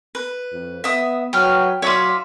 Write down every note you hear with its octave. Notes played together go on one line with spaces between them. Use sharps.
B4
F2
B3 E5 D#6
F#3 B4 G5 F6
F#3 F4 C#5 D5 E5